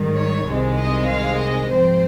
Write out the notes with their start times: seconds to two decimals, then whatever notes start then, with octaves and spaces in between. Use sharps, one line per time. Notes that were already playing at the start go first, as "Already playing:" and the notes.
Already playing: G#2 D#3 G3
0.17 C#5
0.46 C2 C3 D#3 G#3
0.77 D#5
1.08 F5
1.38 D#5
1.68 G#2 F3 C4 C5